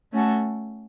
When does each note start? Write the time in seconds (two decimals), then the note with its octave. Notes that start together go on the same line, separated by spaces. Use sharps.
0.12 A3 C#4 F#4 A4